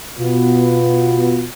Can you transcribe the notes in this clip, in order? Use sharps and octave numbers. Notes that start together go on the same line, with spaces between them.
B2 B3 F4